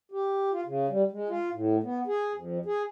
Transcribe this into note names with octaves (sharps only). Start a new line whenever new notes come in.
G4
F4
C#3
G3
G#3
F4
A2
B3
G#4
F2
G#4